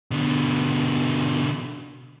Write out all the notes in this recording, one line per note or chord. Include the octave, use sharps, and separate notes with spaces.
B2 D3